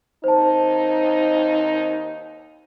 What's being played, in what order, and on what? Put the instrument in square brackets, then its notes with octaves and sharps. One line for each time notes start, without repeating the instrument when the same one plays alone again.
[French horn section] D#2 C4 D#4 [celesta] C5 A5